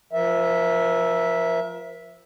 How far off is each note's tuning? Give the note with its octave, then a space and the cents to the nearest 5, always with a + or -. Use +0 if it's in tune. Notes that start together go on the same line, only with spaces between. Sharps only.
F3 +0 A#4 +35 E5 +0